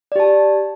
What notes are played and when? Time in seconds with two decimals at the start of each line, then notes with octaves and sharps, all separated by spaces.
0.12 D5
0.16 G4
0.20 A5